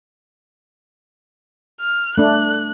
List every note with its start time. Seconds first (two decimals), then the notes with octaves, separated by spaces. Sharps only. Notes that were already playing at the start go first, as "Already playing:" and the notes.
1.81 F6
2.18 A3 D4 F#6